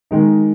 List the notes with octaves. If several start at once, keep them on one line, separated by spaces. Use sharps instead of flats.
D#3 G#3 D#4